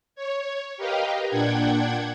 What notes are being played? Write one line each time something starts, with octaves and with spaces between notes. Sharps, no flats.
C#5
G4 A#4 B4 D#5 F5 G5
A#2 D4 F#5 G5 G#6